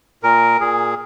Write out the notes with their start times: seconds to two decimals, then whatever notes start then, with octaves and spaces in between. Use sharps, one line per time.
0.23 A#2 A#4
0.60 A#2 G#4